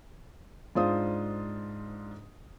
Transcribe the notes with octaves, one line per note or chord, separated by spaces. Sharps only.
G#2 D4 F4 C5 F5 D#6